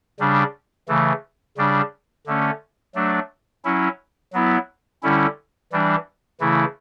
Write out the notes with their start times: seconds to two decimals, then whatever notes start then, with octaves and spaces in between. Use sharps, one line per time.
0.20 C#3 G3 D4
0.88 C#3 E3 A3
1.57 C#3 G3 D4
2.27 D3 A3 C#4
2.95 F#3 A3 D4
3.64 F#3 C#4 E4
4.33 F#3 B3 E4
5.03 D3 G3 C#4 E4
5.72 E3 G3 D4
6.40 C#3 E3 A3 E4